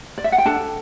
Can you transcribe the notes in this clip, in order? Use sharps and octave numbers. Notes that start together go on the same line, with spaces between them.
D5
E5
F#5
G5
D4 A4 A5